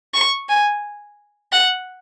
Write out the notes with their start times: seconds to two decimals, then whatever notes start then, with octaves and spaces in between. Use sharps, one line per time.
0.14 C#6
0.49 G#5
1.52 F#5